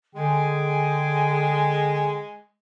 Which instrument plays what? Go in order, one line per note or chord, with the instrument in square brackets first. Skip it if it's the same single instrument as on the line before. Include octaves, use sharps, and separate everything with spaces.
[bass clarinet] D3 [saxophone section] G#3 [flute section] G#4 G5 G#5